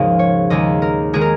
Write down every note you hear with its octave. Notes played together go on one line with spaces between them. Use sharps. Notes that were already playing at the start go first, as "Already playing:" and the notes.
Already playing: G#1 D#2 G#2 C#3 F3 G#3 D#5
C#5
D#2 D#3 G#3 D#5
A#4
D#3 G#3 G#4
A#4